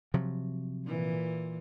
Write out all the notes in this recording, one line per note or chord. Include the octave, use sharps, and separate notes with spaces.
C3 F3 F#3
A#2 E3